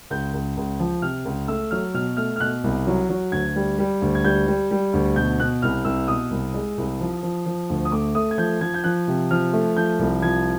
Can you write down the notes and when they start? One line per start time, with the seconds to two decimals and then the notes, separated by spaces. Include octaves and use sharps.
0.10 C#2 G6
0.33 C#2
0.57 C#2
0.79 F3
1.02 C3 F6
1.25 C#2
1.48 A3 E6
1.71 F#3 F6
1.94 B2 F6
2.17 A3 F6
2.36 F6
2.40 B2 F#6
2.64 C2
2.87 F#3
3.09 F#3
3.32 D2 G#6
3.56 G3
3.79 G3
4.02 D2
4.15 G#6
4.24 G3 G6
4.47 G3
4.71 G3
4.93 D2
5.16 B2 G6
5.40 B2 F#6
5.62 C2 F6
5.85 C2 E6
6.08 B2 D#6
6.31 C2
6.54 G#3
6.78 C2
7.00 F3
7.23 F3
7.46 F3
7.70 D2
7.85 D#6
7.92 A3 D6
8.15 A3 D#6
8.31 G#6
8.38 F3 G6
8.61 F3 G#6
8.74 G6
8.84 F3 F#6
9.08 C3
9.31 F3 F6
9.53 A3
9.77 F3 G6
9.99 C2
10.22 F3 G#6